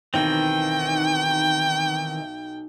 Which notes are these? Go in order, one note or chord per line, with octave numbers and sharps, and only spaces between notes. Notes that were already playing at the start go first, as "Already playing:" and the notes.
B1 D#3 E3 C4 G5